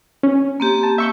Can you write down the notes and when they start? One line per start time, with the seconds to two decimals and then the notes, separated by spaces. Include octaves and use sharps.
0.23 C#4
0.60 A#3 C4 G4
0.83 A5
0.98 E5 C#6 G6